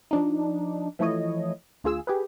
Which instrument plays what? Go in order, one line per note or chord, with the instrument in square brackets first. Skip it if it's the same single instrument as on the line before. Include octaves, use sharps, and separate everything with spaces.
[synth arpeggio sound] F3 D4 D#4
E3 F3 A3 E4 C#5 D#5
D2 F4 G#4 E6
G4 G#4 B4